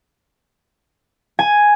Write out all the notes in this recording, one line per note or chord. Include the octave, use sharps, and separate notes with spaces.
G#5